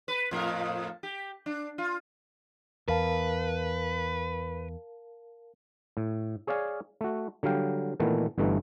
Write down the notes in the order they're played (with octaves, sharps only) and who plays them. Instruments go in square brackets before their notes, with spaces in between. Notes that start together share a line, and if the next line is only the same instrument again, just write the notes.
[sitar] B4
F2 A2 A#4
G4
D4
F4
[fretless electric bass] E2 [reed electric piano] A#4 F5 A5 [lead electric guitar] B4
[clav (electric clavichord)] A2
G#4 C#5 D5 F5 G#5
A3 F#4
D3 F#3 G3 F5 G5
A#2 D#3 E3 A3 B3
G1 G2 E3 A3 D#4